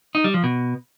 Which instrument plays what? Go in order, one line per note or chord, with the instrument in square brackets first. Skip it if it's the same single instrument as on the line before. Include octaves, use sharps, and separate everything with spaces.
[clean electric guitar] D#4
G3
F3
B2